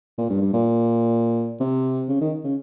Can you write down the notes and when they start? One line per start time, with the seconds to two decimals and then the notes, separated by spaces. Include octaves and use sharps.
0.18 A#2
0.30 G2
0.41 G2
0.53 A#2
1.61 C3
2.09 C#3
2.21 D#3
2.44 C#3